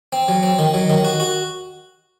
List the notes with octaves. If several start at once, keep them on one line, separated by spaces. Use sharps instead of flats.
C4
F#3
C4
D#3
F#3
D#3
F#4
F#4